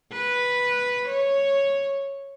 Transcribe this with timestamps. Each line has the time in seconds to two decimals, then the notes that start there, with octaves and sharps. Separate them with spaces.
0.12 B4
1.08 C#5